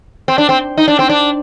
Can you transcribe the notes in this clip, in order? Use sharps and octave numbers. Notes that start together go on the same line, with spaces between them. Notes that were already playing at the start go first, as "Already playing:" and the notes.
C4
D4
C4
D#4
D4
C4
D4